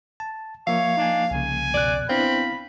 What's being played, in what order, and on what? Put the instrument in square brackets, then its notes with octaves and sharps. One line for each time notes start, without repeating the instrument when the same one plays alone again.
[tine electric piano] A5
[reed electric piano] F3 A#3 [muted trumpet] C#5 [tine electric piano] E5 [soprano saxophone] F5
[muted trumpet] D4 [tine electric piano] D#4 G#5
[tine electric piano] C2 C#3 [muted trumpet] G#5
[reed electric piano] F2 B2 F#6 [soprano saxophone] D5
[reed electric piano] B3 D4 E4 [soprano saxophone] C4 [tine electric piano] F5 [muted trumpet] B5